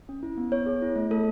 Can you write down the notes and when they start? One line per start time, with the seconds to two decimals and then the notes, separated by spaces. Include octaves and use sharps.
0.09 C#4
0.23 E4
0.37 B3
0.52 B3 C#5
0.66 G#4
0.82 E4
0.96 A3
1.11 A3 A4